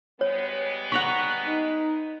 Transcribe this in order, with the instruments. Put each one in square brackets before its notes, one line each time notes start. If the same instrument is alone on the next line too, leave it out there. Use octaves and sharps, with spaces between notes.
[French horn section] G3 G#3 B3 [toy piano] C#5
[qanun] F#5 A#5 B5 [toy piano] C#6
[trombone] D#4